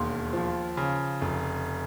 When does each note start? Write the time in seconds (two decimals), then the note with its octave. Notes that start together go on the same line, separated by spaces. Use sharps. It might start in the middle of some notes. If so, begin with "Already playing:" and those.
Already playing: E1 D#2 C6
0.33 F3
0.77 C#3
1.21 F1